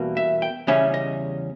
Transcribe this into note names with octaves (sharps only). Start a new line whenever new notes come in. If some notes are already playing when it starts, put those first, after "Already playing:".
Already playing: E2 B2 G3 A#3
E5
G5
E2 C#3 G3 C#4 E5
D#5